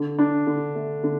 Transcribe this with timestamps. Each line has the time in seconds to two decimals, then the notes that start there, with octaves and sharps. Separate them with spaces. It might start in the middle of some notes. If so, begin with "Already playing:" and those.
Already playing: D3
0.19 D4
0.47 D3
0.75 A3
1.04 D3